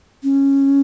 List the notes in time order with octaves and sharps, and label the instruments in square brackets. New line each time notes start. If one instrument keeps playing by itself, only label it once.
[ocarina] C#4